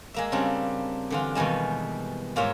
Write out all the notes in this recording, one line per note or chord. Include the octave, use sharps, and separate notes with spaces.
G#3 A#3 E5
C#3 G3 C4 D4
D3 E3 F4
B2 D#3 E3 G3 G#3
G#2 A#3 F4 C#5 E5